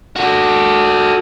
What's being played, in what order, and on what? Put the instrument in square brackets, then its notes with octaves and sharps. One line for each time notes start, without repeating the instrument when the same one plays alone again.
[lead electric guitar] F#4 A4